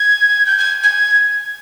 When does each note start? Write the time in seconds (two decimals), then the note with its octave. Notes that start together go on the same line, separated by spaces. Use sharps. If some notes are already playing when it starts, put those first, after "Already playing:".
Already playing: G#6
0.46 G6
0.58 G#6
0.83 G#6